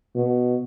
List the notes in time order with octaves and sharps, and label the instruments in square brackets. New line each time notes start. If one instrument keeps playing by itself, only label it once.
[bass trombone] B2